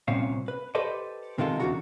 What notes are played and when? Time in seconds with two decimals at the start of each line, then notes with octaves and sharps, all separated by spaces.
0.08 C2 A#2 C4 C#4 F5
0.48 B4
0.75 G4 A4 B4 C5 D5 D#5
1.38 C3 D#3 G#3 F4 A4
1.60 E2 C#3 E3 D4 F#4 A#5